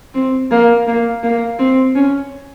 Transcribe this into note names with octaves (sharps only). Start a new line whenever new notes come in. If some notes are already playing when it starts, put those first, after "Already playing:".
C4
A#3
A#3
A#3
C4
C#4